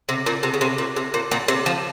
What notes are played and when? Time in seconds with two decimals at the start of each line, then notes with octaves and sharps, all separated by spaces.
0.09 C3
0.26 A#2
0.43 C3
0.54 C#3
0.61 C3
0.78 A#2
0.96 C3
1.14 A#2
1.31 A#2
1.48 C3
1.66 F3